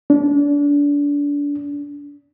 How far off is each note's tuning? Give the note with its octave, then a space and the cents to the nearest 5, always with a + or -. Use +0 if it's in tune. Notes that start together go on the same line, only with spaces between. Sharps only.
D4 -30